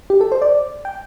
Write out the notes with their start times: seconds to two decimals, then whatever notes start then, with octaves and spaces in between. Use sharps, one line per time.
0.10 G4
0.21 A4
0.32 C5
0.42 D5
0.85 G5